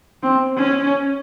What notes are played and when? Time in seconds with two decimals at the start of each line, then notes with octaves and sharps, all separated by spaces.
0.23 C4
0.57 C#4